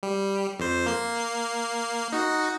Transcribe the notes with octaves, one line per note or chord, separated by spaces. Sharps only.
G3
F2 C5
A#3 C7
D#4 F#4